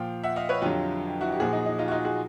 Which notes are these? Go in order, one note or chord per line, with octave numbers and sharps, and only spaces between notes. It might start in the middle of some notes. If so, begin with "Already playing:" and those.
Already playing: A#2 F3 F5 G5
E5 F#5
D#5 F5
B4 C#5
F2 D3 F#3 F4 G4
E4 F#4
G4
A#2 F3 F#4 G#4
D#4
D#4
D#4 F4
F#4
D#4 F4
F#4 G#4